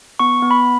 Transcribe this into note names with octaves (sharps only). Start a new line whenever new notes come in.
B3 C#6
B3
B5